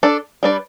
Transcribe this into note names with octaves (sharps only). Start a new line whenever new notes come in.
D4 A4 D5
G3 D4 B4 D5